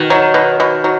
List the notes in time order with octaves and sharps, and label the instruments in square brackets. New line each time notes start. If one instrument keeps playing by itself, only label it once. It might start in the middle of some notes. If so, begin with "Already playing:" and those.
Already playing: [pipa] B2 [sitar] D#3
[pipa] F#3
B2
B2
F#3